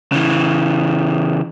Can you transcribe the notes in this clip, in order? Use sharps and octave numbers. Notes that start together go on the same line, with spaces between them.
C#3 E3